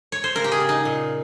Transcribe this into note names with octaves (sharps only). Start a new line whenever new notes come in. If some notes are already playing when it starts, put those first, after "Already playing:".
C#5
C5
C#3 A#4
G4
G#4
C#3
D#4
A#2